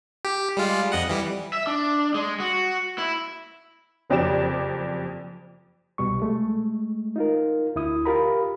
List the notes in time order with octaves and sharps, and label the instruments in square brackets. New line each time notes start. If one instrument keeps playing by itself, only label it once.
[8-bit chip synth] G4
G3 G#3 F4
F2 D#5 F#5
E3 G3
[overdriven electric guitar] E5
D4
G#3
F#4
E4
[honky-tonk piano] F#1 F2 G4 D5 E7
[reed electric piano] C2 B2 G3 C#6
G#3 A3
D#4 F4 A#4
D2 E4 D#6
F4 G4 A#4 A#5 B5